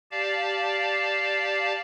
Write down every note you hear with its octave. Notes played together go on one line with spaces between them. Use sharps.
G4 D5 F5 A5